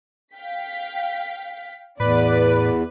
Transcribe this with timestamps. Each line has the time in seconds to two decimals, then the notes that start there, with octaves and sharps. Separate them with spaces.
0.34 F5 G5 B6
2.00 E2 A2 B4 D5